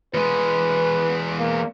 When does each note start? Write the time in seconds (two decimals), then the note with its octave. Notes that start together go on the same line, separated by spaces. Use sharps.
0.14 E2 G#3 B4
1.39 A#3